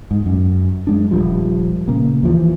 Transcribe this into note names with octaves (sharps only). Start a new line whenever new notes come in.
G#2
F#2
F#2 G#3 D4
D#1 C2 F3 G3
A#2 C#3 A#3
D#2 E3 F3